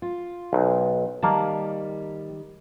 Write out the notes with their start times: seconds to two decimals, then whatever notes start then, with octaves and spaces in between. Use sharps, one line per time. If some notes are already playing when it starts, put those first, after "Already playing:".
0.02 F4
0.53 B1
1.23 D#3 G3 A#3 A5